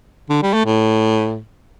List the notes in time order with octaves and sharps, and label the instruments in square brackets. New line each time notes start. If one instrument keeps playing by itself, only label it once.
[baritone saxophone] D3
G3
A3
A2